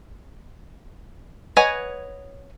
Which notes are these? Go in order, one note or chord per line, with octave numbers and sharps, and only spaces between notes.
B4 C#5 D#5 F#5 G#5